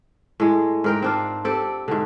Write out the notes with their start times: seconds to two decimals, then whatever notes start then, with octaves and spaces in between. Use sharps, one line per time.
0.40 A2 G#3
0.84 G#2 A#4 G5
1.02 C4 D4 F4
1.45 C4 G4 A4 D5
1.88 G#2 D3